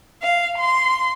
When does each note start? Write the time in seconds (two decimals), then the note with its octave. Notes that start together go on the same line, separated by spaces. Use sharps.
0.21 F5
0.59 C6